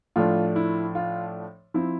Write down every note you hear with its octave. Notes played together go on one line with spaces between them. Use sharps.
A2 F3 A3 D4 F4
E4
F4
F3 C4 E4